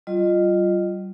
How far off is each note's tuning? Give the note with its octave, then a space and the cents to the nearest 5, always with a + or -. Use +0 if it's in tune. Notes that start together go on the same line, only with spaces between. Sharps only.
G3 -35 F4 -5 D#5 -15